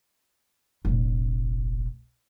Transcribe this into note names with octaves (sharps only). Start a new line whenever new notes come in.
F1 A#1